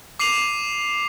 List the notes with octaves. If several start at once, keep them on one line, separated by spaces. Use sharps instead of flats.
D6 C7 D#7 F7 F#7